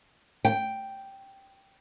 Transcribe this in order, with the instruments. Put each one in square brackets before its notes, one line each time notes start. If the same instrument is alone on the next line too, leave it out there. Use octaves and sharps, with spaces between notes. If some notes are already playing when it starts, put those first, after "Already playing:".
[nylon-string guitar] G5